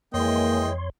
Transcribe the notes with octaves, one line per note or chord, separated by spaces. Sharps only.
F2 E3 G#3 A#3 C#5 D#5 G5 C6